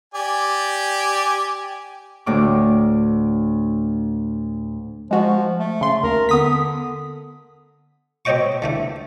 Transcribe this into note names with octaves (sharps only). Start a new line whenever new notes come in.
G4 D5 G#5
D2 A2 D6
F3 G#3 F#4
A3
C#3 C6
D#2 A#4
D3 B3 D#6 B6
B2 C4 C#5 D#5 G5 C#6
D3 E3 A3